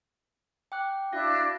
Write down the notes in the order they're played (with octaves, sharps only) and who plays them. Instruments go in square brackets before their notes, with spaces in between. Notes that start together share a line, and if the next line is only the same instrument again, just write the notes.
[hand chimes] G5 D6 F#6
[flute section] D4 E4 F#6 [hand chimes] F#4 F5 A#6